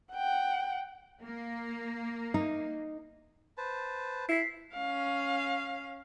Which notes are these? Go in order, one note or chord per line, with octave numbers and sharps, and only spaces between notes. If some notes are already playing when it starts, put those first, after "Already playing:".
F#5 G5
A#3
D#4
B4 C5 A5
E4 B6 C7
C#4 F5